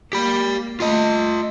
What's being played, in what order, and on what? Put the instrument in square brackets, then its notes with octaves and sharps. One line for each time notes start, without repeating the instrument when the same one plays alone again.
[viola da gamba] A#3 [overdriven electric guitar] G4 B5
[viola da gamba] A3 [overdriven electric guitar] F4 D#5